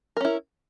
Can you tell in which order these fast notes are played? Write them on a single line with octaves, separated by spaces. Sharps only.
A#4 C#4 E4